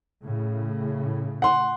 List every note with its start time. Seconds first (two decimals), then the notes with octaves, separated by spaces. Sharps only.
0.23 A2 C#3
1.42 F#5 C6